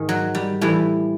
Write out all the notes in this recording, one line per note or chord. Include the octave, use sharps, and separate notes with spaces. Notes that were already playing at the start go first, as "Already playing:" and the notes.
Already playing: G#2 D#3
F#3
G3
A2 E3 G3